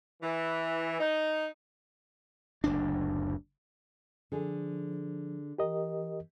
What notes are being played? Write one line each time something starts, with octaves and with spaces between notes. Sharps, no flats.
E3
D#4
F#1 D2 D4
D3 F3 G#4
E3 G4 A#4 D#5